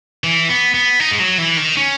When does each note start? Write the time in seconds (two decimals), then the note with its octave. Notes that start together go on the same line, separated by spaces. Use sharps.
0.24 E3
0.49 B3
0.74 B3
1.00 D#4
1.11 G#3
1.20 F#3
1.38 E3
1.57 D#3
1.77 C#4